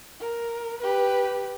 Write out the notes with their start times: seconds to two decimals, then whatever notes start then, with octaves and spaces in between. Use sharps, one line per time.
0.20 A#4
0.81 G4 B4